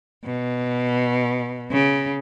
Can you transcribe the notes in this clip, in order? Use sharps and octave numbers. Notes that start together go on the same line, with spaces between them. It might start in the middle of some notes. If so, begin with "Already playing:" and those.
B2
C#3